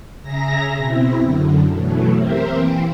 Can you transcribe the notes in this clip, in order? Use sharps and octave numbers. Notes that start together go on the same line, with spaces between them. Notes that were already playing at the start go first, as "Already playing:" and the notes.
C#3 G#4 E5 A#5 A#6
B2 C4 E4
F#2 D3
B2 E3 F#3 A3
C4 G4 A#4 C5 E5
E3 A#3 C4